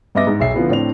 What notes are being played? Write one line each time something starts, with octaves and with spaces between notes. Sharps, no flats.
G2 B3 D#5 E5 D6 A#6
G#2
B1 G#4 E5 C7
D3 F3 B3 E4
A2 C4 D4 F7